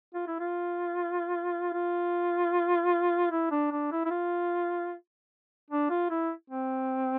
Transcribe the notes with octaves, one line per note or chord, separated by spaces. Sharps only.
F4
E4
F4
F4
E4
D4
D4
E4
E4
F4
D4
F4
E4
C4